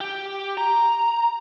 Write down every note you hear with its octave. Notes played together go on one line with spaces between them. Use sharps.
G4
A#5